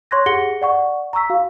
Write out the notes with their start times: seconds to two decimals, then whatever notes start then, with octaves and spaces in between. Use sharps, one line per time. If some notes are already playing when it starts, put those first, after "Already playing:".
0.11 C#5 C6 C#6 F#6 G#6 A#6
0.26 G4 G#4 F#5 A#6 C#7 G7
0.61 D5 F#5 C#6
1.13 A#5 C#6 E6 B6
1.30 F#4 F5